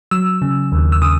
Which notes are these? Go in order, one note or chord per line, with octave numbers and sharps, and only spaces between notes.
F#3 E6
C#3
D#2
E6
C#3 D#6